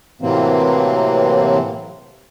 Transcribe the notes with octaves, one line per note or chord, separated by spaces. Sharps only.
A2 C3 E3 F#3 A#3 C4